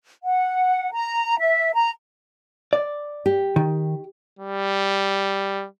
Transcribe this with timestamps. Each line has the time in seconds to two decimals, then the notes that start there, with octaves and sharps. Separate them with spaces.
0.24 F#5
0.92 A#5
1.40 E5
1.74 A#5
2.73 D5
3.26 G4
3.56 D#3
4.39 G3